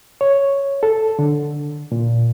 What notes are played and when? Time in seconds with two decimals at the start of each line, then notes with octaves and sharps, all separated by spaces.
0.21 C#5
0.83 A4
1.19 D3
1.92 A#2